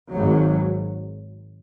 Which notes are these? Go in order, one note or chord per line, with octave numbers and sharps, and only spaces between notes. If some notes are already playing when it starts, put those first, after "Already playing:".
G#1 G#2 F#3